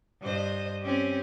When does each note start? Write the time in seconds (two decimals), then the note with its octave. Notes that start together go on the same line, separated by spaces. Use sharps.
0.21 G2 C5 D#5
0.82 C4 C#4 G4